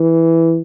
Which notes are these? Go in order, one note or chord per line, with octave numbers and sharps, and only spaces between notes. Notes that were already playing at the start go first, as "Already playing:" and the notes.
Already playing: E3